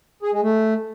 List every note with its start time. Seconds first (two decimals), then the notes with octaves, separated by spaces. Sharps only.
0.22 G#4
0.32 G#3
0.43 A3